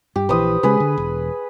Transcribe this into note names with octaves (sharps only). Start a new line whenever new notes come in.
G2 G4
A#1 E3 B4 C5 D#6
C#3 G#3 G#4 B4
D3
E1